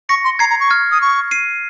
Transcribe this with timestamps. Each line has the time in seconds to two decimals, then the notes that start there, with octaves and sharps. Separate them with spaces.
0.09 C#6 A#6 C#7
0.24 C6
0.39 A#5 G#6 C7
0.50 A#5
0.60 C#6
0.70 F6 G#6
0.91 D#6
1.02 C#6
1.31 C7 D#7